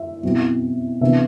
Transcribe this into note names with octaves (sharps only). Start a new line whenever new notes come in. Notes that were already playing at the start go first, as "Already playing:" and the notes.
Already playing: E5
B2 F#3 C4 E4
C3 E3 B3 D4 E5